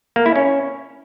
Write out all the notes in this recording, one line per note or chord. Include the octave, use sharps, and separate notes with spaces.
A#3
E4
C#4